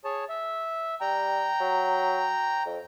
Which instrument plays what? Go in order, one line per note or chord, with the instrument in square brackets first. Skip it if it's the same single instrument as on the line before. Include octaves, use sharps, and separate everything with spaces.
[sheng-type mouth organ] G#4 C#5 A5
E5
[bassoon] G3 [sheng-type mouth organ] G5 A#5
[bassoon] F#3
F2